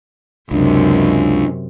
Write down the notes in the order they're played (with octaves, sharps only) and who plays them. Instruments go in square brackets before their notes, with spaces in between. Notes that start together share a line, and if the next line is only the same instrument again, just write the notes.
[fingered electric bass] C#2 [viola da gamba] F#2 C3 [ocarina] D4